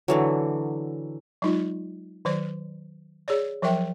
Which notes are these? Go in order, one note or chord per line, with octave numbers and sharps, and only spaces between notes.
D3 E3 F#3
F#3 G#3 D#4 F4
D#3 F#3 C5 D5
G#4 C#5 D5
F3 F#3 A#4 E5 G5